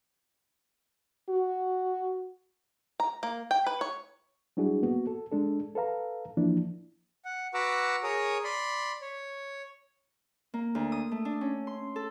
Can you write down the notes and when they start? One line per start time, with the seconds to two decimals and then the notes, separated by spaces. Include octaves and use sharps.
1.29 F#4
3.00 A#5
3.23 A#3
3.51 G5
3.66 B4
3.81 C#5
4.57 F#3 G3 D4 E4 F#4 G#4
4.83 A#3 B3 F#4
5.07 A4
5.31 G#3 D4 A4
5.75 A4 B4 F5 A#5
6.37 E3 F3 A#3 D4 E4
7.25 F#5
7.54 F#4 B4 F#5 A#5 D6 E6
8.03 G#4 A#4 C#5 A#5 D#6
8.44 D5 B5 C6
9.01 C#5
10.54 A#3
10.75 D2
10.92 D#6
11.12 A3
11.25 D4
11.41 C#4
11.67 C6
11.96 A4